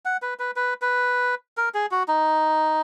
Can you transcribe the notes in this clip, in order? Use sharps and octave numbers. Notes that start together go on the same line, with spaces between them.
F#5
B4
B4
B4
B4
A#4
G#4
F#4
D#4